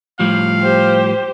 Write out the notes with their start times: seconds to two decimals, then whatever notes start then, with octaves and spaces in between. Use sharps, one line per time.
0.19 A2 F3 G3 F5
0.61 G4 C5